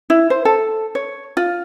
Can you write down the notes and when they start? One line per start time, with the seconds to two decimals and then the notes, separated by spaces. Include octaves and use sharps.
0.10 E4
0.30 C5
0.45 A4
0.95 C#5
1.37 F4